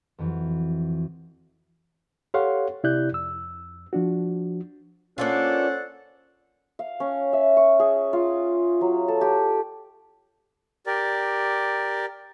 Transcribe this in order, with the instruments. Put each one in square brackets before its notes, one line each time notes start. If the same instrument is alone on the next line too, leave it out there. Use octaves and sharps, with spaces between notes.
[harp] F2 E3 F#3
[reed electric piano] G4 A4 C#5 F5 F#5 C6
C3 E4 G4 D5 F#6 G6
F2 E6
F3 D4 F#4
[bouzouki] A#3 D4 F4 [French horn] C#4 [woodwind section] A4 C5 F#5
[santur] F5
C#4
E5
C#6
G#4
F4
F#3
A4
G4
[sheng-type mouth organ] G4 A#4 D5